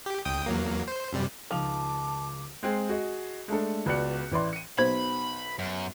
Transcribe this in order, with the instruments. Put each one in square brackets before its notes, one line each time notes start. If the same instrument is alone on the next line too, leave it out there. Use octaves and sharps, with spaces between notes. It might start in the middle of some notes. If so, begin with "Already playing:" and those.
[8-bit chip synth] G4
C#2 G5 D#6
E2 F#3 A#3
C5
F#2 C3 G3
[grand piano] C#2 D#3 F7 [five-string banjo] F3 [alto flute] A5 [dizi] D6
[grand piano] G#3 C4 G#4
F#4 G#4 D#5
G#3 A3 D4 A4
C#2 B3 F#4 D5 F#6 C#7
A1 E3 D5 C6
C#7 D#7
[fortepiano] B1 [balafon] C5 [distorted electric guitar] B5
[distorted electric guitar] F#2